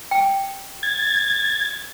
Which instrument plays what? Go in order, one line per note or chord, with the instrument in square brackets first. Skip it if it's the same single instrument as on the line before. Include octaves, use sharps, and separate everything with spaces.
[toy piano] G5
[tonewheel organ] G#6 A6